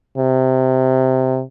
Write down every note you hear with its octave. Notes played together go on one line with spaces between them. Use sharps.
C3